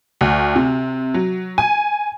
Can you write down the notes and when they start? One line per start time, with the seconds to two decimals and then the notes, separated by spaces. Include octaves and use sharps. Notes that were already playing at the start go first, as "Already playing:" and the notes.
0.21 D2
0.56 C3
1.14 F#3
1.58 G#5